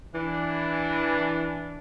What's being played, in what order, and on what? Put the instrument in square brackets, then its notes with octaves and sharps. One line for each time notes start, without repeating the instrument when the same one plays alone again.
[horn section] E3 D4